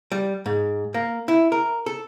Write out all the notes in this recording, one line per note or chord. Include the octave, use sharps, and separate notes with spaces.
G3
G#2
A#3
E4
A#4
A4